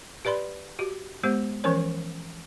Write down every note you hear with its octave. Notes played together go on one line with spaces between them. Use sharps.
G4 B4 D5 B5 C6
F#4 G4
G#3 B3 G4 C5
E3 F3 C#4 A#4 C5 C#5